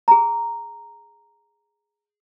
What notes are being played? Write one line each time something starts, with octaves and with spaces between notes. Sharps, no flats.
G#4 A#5